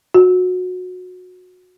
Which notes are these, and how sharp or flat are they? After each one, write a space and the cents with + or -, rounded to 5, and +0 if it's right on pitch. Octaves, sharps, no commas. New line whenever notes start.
F#4 -20